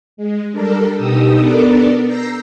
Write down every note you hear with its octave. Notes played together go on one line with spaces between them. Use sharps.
G#3
G3 D4 A4 A#4
B2 D#4 G4 D#6 E6
B3 D4 A4 A#4 D5
A#5 E6 G6 A#6 C7